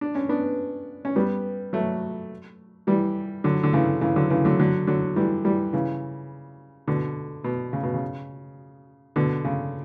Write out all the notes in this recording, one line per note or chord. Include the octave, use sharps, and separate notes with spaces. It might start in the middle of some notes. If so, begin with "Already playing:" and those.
D4
C#4
B3 D4
C#4
G3 B3
F#3 A3
E3 G3
D3 F#3
D3
C#3 E3
C#3 E3
D3 F#3
C#3 E3
D3 F#3
D3 F#3
D3 F#3
E3 G3
E3 G3
C#3 E3
B2 D3
B2
C#3
B2
C#3
B2 D3
C#3